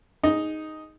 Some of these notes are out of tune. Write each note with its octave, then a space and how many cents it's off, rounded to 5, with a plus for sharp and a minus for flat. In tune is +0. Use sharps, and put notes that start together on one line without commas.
D#4 +0 G#4 +0 D#5 +0